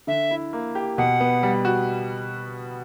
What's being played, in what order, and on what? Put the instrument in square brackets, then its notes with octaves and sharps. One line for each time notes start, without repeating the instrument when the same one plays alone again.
[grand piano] D3 [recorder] E5
[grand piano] E4
A#3
G4
[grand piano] B2 [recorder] F#5
[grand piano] B3
G3
F#4